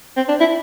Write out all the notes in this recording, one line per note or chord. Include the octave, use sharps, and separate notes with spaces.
C4
D4
E4